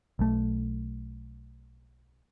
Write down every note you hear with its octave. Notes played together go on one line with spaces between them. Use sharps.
B1 A3